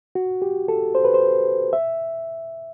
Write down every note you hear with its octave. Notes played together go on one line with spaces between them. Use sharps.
F#4
G4
A4
C5
B4
C5
E5